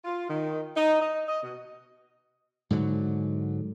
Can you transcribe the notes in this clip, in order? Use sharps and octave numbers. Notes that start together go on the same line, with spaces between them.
F4
D#3
D#4
D#5
D#5
B2
G#2 D3 F#3